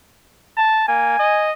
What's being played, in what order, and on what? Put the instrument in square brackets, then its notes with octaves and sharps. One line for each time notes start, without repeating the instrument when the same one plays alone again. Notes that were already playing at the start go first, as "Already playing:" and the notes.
[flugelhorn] A5
[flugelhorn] A#3 [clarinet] G#5
[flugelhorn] D#5